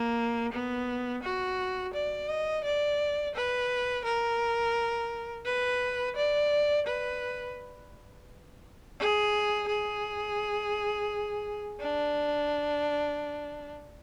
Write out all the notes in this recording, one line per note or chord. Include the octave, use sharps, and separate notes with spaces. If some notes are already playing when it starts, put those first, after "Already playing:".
Already playing: A#3
B3
F#4
D5
D#5
D5
B4
A#4
B4
D5
B4
G#4
G#4
D4